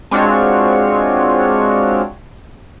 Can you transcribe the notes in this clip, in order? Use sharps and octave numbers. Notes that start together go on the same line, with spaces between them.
G#3 C4 D4 F4 F#4 C#5